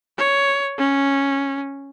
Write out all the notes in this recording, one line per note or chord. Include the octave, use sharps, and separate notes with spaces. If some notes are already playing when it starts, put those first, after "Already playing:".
C#5
C#4